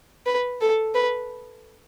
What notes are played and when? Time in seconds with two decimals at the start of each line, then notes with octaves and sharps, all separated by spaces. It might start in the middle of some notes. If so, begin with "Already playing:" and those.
0.26 B4
0.61 A4
0.95 B4